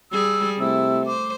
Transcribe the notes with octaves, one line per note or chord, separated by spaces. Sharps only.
G3 G#4 E6
C3 A3 E4 E6
C5 D6